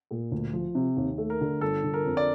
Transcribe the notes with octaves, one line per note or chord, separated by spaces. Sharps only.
A#2
D2
F3
C3
D#2
A3
A#4
D3
G1 A4
D3
A#4
F2
D5